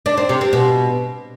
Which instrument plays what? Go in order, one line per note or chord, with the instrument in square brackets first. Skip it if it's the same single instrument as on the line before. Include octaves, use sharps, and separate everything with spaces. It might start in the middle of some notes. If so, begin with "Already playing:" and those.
[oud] D4
C4
C3
C4
B2